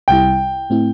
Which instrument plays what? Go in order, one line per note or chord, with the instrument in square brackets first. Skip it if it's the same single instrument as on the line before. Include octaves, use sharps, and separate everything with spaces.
[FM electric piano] C2 C3 G3 E4 [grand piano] G5
[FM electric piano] A2 A3 C4 E4